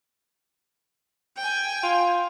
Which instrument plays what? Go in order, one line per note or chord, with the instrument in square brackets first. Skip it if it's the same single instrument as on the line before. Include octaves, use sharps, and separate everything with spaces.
[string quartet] G5 G#5
[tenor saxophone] F4